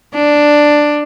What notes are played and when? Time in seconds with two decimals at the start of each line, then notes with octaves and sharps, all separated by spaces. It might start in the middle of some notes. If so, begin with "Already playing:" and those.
0.14 D4